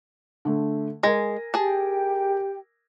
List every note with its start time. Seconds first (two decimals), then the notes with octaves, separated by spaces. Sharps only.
0.45 D3 A3
1.03 G#3 A#4 G#5 A#6
1.54 G4 G#4 G5 A5